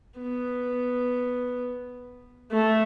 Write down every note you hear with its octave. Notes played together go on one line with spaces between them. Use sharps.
B3
A3